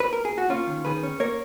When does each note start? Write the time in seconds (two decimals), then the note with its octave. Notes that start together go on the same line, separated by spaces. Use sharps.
0.00 B4
0.13 A#4
0.25 G#4
0.38 F#4
0.49 A#3 C#4 F4
0.67 D#3
0.85 D#3 G#4 B4
1.03 C#4
1.20 A#3 A#4 C#5